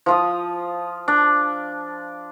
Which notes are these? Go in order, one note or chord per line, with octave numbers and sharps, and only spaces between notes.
F3 F4 D#6
D4